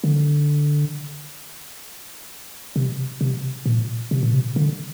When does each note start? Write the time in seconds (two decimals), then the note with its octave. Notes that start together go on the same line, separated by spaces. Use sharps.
0.04 D3
2.76 C3
3.21 C3
3.66 A#2
4.11 C3
4.23 A#2
4.33 C3
4.56 D3